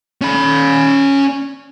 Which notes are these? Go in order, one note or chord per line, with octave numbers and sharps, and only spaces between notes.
C#4 B5